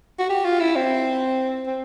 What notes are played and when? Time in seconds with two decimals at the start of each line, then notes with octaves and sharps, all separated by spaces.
0.19 F#4
0.29 G4
0.45 F4
0.60 E4
0.76 C4
1.67 C4